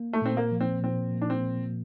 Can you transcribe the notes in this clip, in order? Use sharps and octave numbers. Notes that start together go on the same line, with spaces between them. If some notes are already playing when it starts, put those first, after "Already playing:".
Already playing: A#3
A3
A#2 C4
A#3
F3
C4
A#2 C4
A#3
D4
C4
A#2